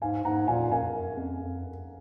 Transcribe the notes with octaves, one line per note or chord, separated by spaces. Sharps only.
G#2 F5 G#5
G#2 F#5 A#5
A#2 F5 G#5
F#2 F5 G#5
F#2
F2
F2
F#2